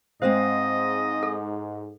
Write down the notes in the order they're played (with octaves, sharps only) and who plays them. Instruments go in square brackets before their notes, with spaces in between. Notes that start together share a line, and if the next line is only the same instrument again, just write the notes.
[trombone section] G#2 [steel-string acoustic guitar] G#3 C4 F5 [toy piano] C5 D#6 [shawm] D#5
[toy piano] A4